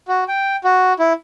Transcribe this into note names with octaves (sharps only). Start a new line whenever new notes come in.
F#4
G5
F#4
E4